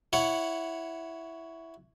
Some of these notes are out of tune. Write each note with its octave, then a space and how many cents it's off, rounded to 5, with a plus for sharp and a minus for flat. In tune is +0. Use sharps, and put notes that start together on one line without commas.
E4 +0 C#5 +10 F#5 +0